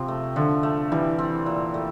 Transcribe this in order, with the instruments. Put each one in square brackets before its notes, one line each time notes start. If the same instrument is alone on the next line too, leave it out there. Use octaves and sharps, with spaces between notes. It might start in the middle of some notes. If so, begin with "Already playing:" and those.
Already playing: [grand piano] C3 [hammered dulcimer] F3 C4
[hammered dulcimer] A3
[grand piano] D3 [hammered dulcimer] F3
[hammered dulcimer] A3
[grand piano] E3 [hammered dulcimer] G3
[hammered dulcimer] C4
A#2
A3